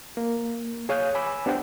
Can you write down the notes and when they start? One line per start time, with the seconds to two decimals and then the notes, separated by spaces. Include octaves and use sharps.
0.17 A#3
0.89 G#4 C#5 F5 D#6 F#6 G6
1.15 G#5 B5 D6 E6
1.46 B3 D4 G4 C5 F#5 G5